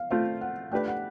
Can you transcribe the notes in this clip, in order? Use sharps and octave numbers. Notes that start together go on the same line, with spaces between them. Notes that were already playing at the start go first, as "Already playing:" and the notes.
Already playing: F5
A3 C4 F4 F5
F#5
A3 D4 G4 B4 G5
F#5